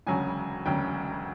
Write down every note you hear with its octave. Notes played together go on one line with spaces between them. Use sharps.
E1 D2 C#3 F#3 G#5
E1 D2 C#3 F#3 G5